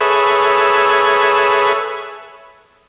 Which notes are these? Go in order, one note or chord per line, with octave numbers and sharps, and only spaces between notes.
G#4 A4 B4 C#5 E5